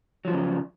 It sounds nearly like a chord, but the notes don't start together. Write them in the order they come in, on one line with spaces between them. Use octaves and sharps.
F#3 F3 F2 C#3